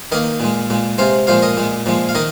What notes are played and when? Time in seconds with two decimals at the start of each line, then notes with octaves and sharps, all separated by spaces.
0.12 D#3 A#3 A#4 D#5
0.40 A#2 G#3
0.70 A#2 G#3
0.98 C3 G#3 C5 F5
1.27 A#2 F3 G#3 C5 F5
1.42 A#4 D#5
1.57 A#2 G#3
1.86 A#2 F3 G#3
2.09 F5
2.15 D#3 A#4 D#5